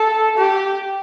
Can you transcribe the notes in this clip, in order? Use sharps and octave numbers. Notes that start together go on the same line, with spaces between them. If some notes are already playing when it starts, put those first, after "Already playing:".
Already playing: A4
G4